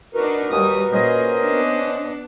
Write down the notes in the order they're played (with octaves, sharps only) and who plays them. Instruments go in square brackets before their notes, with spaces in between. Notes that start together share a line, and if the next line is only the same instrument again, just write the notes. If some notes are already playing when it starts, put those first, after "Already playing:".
[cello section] D4 D#4 [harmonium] F#4 A#4 B4
[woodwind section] D#2 D#6 [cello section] G3
[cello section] A#2 G#4 [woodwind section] C#4 C5 D#5
[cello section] B3 D4